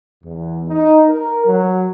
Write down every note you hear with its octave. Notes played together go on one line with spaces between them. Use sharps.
E2
D#4
A#4
F#3